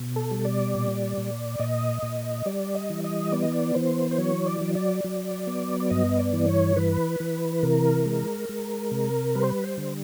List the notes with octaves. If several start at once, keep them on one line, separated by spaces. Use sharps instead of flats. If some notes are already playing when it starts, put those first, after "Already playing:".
Already playing: B2
A4
G3
D5
A#2
A#2
A#2 D#5
A#2
G3 D5
D#5
E3
D#5
B3 D5
D#5
D5
E3 C5
C5
F#3 C#5
D5
F#3
D5
F#3
B3
D5
G2 D#5
D5
E3
C#5
E3 B4
E3
C3 A#4
G#3
G#3
C3
G3 B4
C5
B4
C5
D3